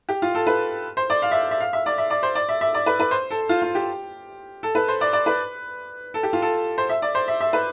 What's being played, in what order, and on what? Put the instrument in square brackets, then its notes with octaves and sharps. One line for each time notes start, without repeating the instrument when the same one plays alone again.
[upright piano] G4
F4
A4
B4
C5
D5
F5
E5
E5
F5
E5
D5
E5
D5
C5
D5
E5
E5
D5
B4
B4
C5
A4
F4
F4
G4
A4
B4
C5
D5
D5
B4
A4
G4
F4
A4
C5
E5
D5
C5
E5
E5
B4